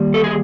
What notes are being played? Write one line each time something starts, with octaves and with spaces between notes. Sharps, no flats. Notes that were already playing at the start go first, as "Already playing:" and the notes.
Already playing: D#3 G3 A#3
A4
G#4